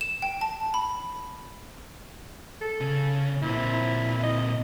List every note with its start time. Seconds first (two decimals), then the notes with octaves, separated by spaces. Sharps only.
0.01 E7
0.22 G5
0.41 A5
0.74 B5
2.61 A4
2.81 C#3
3.42 A#2 C4 E4
4.23 D#5